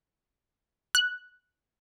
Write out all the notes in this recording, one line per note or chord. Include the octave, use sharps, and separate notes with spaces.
F#6